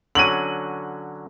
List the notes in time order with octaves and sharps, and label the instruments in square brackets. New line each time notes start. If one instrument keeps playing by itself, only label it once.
[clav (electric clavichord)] D3 F#3 C#4 [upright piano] D#7 F#7